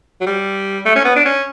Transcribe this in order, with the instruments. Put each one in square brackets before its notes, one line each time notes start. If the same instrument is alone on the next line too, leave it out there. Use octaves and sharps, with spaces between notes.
[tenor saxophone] F#3
G3
A3
C#4
B3
D4
C#4